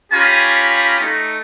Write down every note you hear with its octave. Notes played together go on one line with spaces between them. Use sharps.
C#4 F4 G4 G#5 A#5 B5
A3 D#4